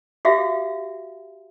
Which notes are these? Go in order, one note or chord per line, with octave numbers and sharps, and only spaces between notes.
F#4 G4 E5 F5